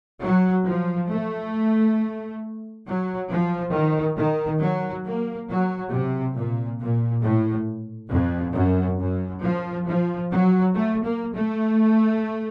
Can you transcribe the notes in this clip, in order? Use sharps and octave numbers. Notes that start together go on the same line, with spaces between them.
F#3
F3
A3
F#3
F3
D#3
D#3
F#3
A#3
F#3
C3
A#2
A#2
A2
F2
F#2
F#2
F3
F3
F#3
A3
A#3
A3